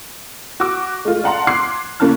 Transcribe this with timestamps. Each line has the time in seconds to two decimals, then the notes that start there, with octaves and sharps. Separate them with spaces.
0.60 F#4 D6
1.05 G#3 A3 F4
1.24 D5 F5 F#5 A5 A#5 C6
1.47 C6 D6 F#6 G#6 C7
2.00 C#3 A#3 C#4 E4 A5 F#6